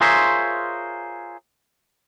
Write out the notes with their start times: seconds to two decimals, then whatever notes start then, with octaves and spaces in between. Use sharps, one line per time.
0.01 F4 G#4 A#4 C5 C#5 E5